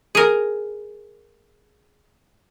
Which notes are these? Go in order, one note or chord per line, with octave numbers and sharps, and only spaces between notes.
G#4 A#4